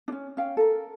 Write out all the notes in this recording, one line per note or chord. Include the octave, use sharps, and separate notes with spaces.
C#4 D4
C#4 F5 G5
A4 A#4